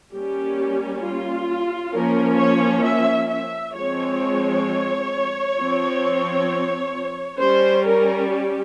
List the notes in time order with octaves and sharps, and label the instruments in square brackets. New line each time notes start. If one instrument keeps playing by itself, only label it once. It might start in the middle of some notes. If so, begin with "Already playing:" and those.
[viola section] G3 A#3 C#4 G4
F4
F3 A#3 C#4 A#4
C#5
E5
E5
F3 G#3 C4 C#5
F3 C4
G3 C#4 C5
A#4
G4